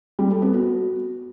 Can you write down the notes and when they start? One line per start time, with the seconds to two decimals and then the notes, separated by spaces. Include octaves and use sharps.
0.19 G3
0.30 A4
0.42 B3
0.54 F#4